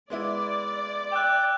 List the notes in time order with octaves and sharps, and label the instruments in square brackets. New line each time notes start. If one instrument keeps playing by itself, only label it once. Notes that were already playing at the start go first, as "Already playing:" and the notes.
[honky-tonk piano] G#3 B3 E4 [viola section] D5
[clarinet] G5 [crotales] D6 E6 F#6